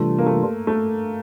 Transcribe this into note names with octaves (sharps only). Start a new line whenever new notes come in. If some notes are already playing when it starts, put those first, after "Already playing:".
Already playing: C3 E3 G3 A3 D4 F4
A#3
A3
A3